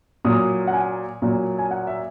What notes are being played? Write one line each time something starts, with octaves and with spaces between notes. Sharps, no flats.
A#2 F#3 D#6
F#5
G#5
A#2 F#3
G#5
F#5
E5